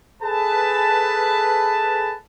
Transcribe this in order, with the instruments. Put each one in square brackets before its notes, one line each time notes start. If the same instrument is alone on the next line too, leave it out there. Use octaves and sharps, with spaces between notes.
[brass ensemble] G#4 A4 B4 A5